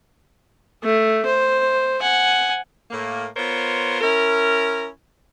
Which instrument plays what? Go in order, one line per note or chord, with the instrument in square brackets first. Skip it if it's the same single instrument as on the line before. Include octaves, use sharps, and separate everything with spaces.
[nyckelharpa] A3
C5
F#5 G#5
[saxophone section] A2 A#3
B3 F4 A#4 C5 C#5
C#4 E4 A#4